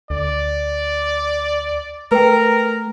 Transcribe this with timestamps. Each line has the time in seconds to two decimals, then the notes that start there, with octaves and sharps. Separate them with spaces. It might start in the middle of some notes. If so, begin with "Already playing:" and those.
0.10 D2 D5
2.12 A3 A#4 B4 G5